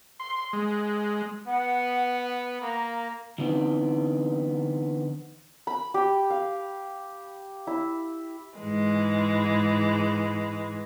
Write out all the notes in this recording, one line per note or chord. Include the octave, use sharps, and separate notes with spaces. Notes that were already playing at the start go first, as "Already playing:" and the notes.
C6
G#3
B3 F#5
A#3 A#5
D3 E3 B3 C4 D#4
B5
G4
F5
E4
G#2 E3 G#3